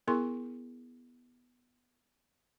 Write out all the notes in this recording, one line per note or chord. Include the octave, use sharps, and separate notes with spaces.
B3 E4 G#4 A#4 C6 C#6